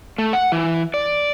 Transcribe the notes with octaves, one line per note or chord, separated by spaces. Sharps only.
A3
F#5
E3
D5